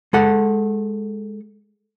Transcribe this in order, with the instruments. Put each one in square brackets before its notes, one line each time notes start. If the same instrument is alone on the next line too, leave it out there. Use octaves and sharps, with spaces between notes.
[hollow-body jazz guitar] G#3 A4 F#5